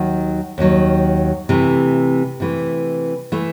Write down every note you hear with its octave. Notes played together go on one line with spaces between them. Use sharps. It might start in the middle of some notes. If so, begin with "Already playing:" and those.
Already playing: D#2 D#3 F#3
D#2 D#3 F#3
C3 E3 A3
C3 E3 A3
E3 A3